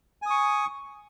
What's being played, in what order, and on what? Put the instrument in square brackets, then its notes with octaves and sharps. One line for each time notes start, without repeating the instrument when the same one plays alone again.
[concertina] G#5
D#6
C#6